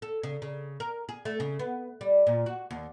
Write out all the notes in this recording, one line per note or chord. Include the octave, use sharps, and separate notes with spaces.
A4
C#3
C#3
A#4
G#4
A3
C#3
B3
G3
A#2
F#4
D#2